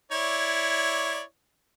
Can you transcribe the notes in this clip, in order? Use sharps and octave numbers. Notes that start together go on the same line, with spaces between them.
E4 C#5 D5